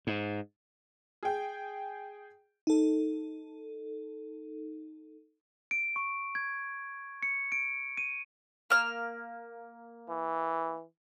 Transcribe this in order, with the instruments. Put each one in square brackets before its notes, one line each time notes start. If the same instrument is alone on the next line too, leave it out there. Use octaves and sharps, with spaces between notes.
[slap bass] G#2
[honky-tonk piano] G#4 G5
[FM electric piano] D#4 A4
[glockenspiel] D7
C#6
G#6
C#7
D7
D#7
[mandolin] A#3 F6
[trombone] E3